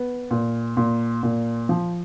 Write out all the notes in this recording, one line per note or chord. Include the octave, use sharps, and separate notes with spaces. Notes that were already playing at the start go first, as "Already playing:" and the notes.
Already playing: B3
A#2
A#2
A#2
F3